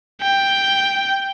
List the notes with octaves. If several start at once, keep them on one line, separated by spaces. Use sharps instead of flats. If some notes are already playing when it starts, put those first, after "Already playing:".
G5